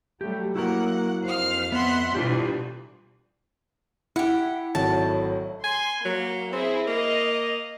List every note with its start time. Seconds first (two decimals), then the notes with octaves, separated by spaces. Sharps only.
0.21 F#3 G3 A3 G4
0.55 F#3 A#3 E4 F#4 A#4 F#5
1.24 F2 C5 F5 F6
1.72 B3 E5 F#5 C6
2.15 D2 G2 B2 E3 F4 G4
4.16 E4 G4 F#5
4.75 G#1 A2 F#3 F#5 A5
5.64 G#5 C6
6.05 F#3 A#3
6.53 C4 E4 G#4
6.88 A#3 D#5